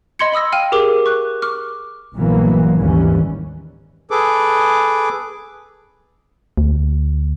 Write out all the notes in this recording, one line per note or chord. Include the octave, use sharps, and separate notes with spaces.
D#5 B5 C6 G#6 C#7
D#5 B5 D#6 E6 A#6
F5 G5 F6 D#7
G4 G#4 A#4 D6
C#6 F#6
C#6 D6 F6
A#1 G2 E3 F#3 A#3 B3
G#1 D#2 E3 G3 C#4
G#4 A4 B4 D6
D2